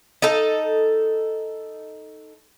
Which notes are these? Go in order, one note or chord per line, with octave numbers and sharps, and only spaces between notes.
D#4 A4